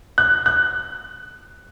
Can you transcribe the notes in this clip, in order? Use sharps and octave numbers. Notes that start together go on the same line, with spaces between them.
F#6
F#6